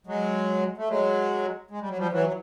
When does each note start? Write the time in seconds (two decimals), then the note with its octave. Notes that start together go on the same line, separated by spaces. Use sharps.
0.07 F#3 G#3
0.78 A3
0.88 F#3 G#3
1.71 G#3
1.80 G3
1.89 F#3
1.98 F3 G3
2.11 E3 F#3
2.27 F#3